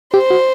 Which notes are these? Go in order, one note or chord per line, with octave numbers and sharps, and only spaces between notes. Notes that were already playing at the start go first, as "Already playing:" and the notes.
G4 C5
F#4